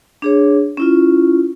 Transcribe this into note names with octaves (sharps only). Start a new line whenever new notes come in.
D4 G#4 C#5
C#4 E4 F4